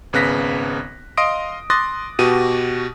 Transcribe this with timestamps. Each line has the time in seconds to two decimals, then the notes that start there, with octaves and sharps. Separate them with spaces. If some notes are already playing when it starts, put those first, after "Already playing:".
0.13 G#1 C#3 B3 F#6 A#6 B6
1.17 D#5 F5 C6 D#6 A#6 D7
1.70 C6 D6 D#6 F#6 A6 A#6
2.19 B2 F#4 G4 D#7